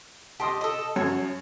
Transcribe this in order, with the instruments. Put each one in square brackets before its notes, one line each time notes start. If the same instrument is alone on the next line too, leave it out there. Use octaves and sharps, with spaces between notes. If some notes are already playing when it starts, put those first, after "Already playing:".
[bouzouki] G4 D#5 [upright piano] A5 C6 D#6
[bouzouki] A4 D#5
[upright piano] F#2 [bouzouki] C#5